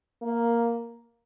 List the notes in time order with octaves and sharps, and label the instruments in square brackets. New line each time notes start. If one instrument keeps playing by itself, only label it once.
[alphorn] A#3